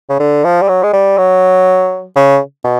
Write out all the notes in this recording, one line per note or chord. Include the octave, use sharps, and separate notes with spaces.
C#3
D3
F3
G3
F#3
G#3
G3
F#3
C#3
B2